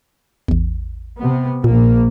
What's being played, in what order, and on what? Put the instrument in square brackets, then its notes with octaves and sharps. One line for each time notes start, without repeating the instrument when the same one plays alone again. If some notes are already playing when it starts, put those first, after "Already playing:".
[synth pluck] A1 E2
[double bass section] C3 B3
[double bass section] A#1 A#3 [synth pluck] A#2